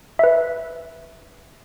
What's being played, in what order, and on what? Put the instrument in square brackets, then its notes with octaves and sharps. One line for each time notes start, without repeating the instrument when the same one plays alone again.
[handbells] B4 E5